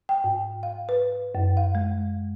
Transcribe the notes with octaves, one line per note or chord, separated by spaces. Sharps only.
G5
G#2
F5
B4
F#2
F5
G#3